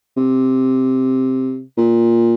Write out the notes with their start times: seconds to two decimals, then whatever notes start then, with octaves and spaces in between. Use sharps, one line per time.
0.17 C3
1.77 A#2